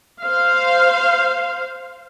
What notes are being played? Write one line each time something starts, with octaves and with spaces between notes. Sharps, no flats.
C5 F5